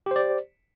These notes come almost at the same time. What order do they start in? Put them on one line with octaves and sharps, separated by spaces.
G4 C5 D5